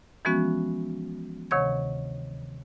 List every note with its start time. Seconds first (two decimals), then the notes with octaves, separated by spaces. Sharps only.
0.25 E3 F3 G#3 B3 C#4 F#4
1.51 D2 C3 D#3 C#5 C#6 G#6